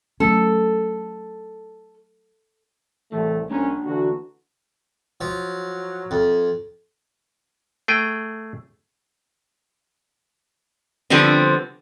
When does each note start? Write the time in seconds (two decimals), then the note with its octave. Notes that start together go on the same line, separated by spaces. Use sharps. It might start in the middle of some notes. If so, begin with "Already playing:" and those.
0.20 F#3 A3 C#4 A4
3.12 C2 A2 E3 A3
3.50 C2 A#3 C#4 D4 A#5
3.85 D3 E3 F#4
5.21 F3 F#3
6.11 F2
7.88 A3 G#4 G5
11.10 D3 F3 G3 B3 C4